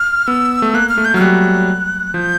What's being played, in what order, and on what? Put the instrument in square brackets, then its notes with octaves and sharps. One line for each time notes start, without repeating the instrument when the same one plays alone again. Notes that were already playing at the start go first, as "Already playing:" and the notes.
Already playing: [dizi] F6
[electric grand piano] B3 [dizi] E6
[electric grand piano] A3
[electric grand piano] A#3 [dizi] F#6
[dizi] F6
[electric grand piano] A3
[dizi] G6
[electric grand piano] F#3 [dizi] F6
[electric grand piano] G3 [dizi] F#6
[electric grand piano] F3 [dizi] G6